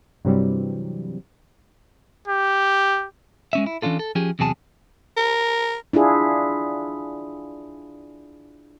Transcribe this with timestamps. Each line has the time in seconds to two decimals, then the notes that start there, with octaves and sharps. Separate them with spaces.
0.25 G2 C3 E3 F#3 G3 C4
2.28 G4
3.53 G#3 C#4 E5
3.66 E4
3.82 E3 C#4 D4 F4 A4
3.99 A4
4.15 F3 C#4 G4 G#4
4.39 E2 C3 F#3 G#4 A5
5.17 A#4
5.93 D4 E4 F4 G#4